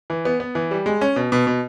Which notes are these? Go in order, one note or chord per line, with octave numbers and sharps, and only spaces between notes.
E3
B3
B3
E3
G3
G#3
C#4
B2
B2
B2